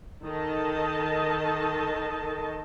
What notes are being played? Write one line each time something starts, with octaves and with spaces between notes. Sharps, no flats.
D#3 A4 D#5 A5